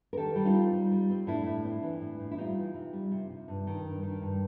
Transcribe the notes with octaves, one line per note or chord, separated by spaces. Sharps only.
A#4
D#3 G4 A4
G3
D#4 F4
C4
G3
G3
C4
A2 D4 E4
A2
C4
E3
A2
A2
E4
G3 D#4 F4
E3
C3
G3
C3
C3
G2
D#3
G2
D#3
G2